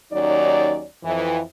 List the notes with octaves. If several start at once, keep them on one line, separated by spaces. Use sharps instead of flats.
D#2 F#3 C#4 D#4 D5
F2 E3